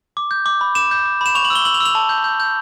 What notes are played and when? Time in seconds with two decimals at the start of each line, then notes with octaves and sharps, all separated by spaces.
0.17 D6
0.31 G6
0.46 D6
0.61 B5
0.75 D6 E7
0.91 G6
1.05 D6
1.21 B5 E7
1.35 C#6 F7
1.45 F#7
1.50 E6
1.55 G7
1.65 E6 F#7
1.74 F7
1.80 E6
1.85 F7
1.95 A5
2.09 G6
2.24 G6
2.40 G6